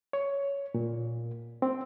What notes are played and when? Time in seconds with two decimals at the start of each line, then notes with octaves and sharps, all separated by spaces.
0.13 C#5
0.74 A#2
1.62 C4